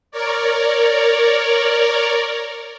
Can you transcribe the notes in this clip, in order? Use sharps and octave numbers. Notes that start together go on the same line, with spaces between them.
A#4 C#5 D5